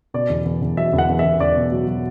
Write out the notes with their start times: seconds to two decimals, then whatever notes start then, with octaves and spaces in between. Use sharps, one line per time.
0.14 B2 D5
0.30 E2
0.45 E2
0.62 E2
0.77 F#3 E5
0.93 E2
0.98 F#5
1.09 E2
1.19 E5
1.25 E2
1.40 E2 D5
1.56 B2
1.72 F#3
1.88 F#3